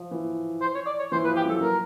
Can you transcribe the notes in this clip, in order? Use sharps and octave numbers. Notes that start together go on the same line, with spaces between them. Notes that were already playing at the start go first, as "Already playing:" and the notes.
Already playing: F3
E3
C5
C#5
D5
C#5
E3 C5
B4
F3
G4
F#3
A4
F#3 A#4